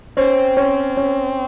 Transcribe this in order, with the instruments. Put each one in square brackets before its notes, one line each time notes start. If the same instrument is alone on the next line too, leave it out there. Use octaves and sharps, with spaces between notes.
[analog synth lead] C4 [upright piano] C#4
[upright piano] C#4
C#4